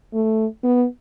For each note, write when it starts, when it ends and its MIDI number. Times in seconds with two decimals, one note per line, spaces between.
0.14 0.46 57
0.64 0.86 59